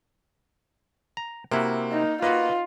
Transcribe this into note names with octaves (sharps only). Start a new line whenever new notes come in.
A#5
C3 A#3 E4 F#4
D#4
A#3 F4 F#4 B4 D#5